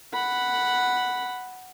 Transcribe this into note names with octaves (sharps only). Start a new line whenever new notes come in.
F#5 B5